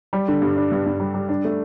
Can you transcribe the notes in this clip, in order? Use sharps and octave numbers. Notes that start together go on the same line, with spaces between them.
G3
D3
G2
D4
G2
G2
G3
G3
D4
A3